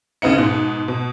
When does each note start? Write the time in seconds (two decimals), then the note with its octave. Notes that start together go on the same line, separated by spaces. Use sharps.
0.22 D2 C#3 B3 D#4 C#7
0.38 G#2 B2
0.88 B2